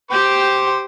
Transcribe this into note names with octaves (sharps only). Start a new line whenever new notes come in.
G4 C5 G5 D6